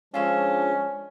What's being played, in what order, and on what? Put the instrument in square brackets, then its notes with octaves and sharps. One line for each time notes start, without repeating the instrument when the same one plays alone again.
[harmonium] F3 G#3 D4 [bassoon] C#4 [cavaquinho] F4 A4 C#5